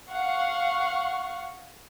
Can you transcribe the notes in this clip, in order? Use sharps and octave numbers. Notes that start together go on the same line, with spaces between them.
F5 F#5 C#6